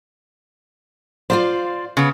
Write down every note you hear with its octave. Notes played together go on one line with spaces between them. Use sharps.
F4 C5 D5 F5
C#3 B3